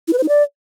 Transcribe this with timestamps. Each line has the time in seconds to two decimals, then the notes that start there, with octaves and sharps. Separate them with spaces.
0.08 E4
0.13 B4
0.18 C5
0.23 D#4
0.28 D5